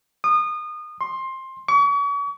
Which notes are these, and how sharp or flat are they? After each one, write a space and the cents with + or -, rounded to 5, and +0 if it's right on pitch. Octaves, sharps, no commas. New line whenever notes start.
D#6 -30
C6 +15
C#6 +40